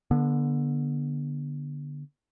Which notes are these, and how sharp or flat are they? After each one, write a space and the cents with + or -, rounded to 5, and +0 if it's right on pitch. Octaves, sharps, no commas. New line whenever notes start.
D3 +0 B3 -35